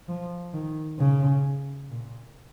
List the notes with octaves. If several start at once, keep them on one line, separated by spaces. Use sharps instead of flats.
F3
D#3
C#3
A#2